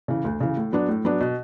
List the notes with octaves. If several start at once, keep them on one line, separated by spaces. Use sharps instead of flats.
C#3 E3
D2
C#3 E3
A2
F#3 B3 D4
A2
F#3 B3 D4
B2